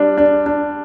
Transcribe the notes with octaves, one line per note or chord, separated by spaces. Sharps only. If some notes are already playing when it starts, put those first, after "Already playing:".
Already playing: G3 D4
D4
D4